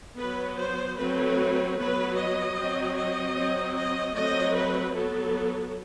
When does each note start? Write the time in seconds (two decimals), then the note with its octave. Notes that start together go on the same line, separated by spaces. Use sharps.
0.19 F#3 B3 B4
0.59 C5
0.98 F#3 A3 C4 B4
1.78 F#3 B3 B4
2.17 D#5
2.57 F#3 C4
2.97 D#5
3.35 F#3 C4
3.75 D#5
4.15 F#3 A3 C4 D#5
4.54 B4
4.93 F#3 B3 A4